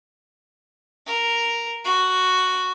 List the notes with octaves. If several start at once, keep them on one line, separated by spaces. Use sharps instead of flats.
A#4
F#4